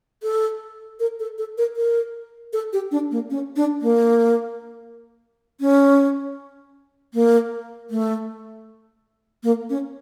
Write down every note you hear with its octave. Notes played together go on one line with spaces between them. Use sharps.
A4
A#4
A4
A4
A#4
A#4
A4
G4
D4
A#3
C#4
D4
A#3
C#4
A#3
A3
A#3
C#4